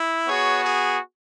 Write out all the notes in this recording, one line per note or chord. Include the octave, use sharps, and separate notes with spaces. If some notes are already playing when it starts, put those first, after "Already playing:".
Already playing: E4
B3 F#4 G#4 C#5
G#4